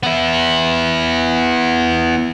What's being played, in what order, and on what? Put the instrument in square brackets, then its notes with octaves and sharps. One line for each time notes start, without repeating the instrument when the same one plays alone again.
[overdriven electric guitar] B3 E4